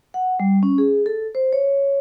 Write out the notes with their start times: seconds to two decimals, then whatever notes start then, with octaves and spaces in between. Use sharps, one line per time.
0.14 F#5
0.40 G3
0.63 C#4
0.78 G#4
1.06 A4
1.35 C5
1.53 C#5